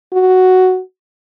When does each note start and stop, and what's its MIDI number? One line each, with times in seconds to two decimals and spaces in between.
0.13 0.81 66